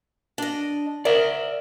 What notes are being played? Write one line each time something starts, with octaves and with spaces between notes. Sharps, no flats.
D4 D#5
A#4 D5 E5